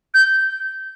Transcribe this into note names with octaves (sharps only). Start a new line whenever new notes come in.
G6